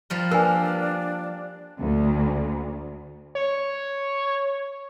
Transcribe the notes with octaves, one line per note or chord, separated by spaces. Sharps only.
F3 G3 A#4
A#3 D4 A#4 B4 G#5
D2
C#5